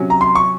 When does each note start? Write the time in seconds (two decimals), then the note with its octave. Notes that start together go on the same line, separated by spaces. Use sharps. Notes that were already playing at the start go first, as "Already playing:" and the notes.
Already playing: C3 F#3 C#4
0.10 A#5
0.21 C6
0.35 C#6